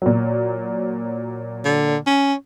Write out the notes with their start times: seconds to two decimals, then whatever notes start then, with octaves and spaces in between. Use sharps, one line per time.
0.02 A#2 F#3
1.65 D3
2.06 C#4